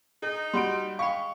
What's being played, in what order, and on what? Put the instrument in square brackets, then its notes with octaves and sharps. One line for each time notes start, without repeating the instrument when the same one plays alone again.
[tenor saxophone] D#4 [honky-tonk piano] G#4
[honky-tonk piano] G3 F#4 D7 [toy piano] C6
[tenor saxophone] G#3 [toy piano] F5 G5 B5 [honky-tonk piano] C#6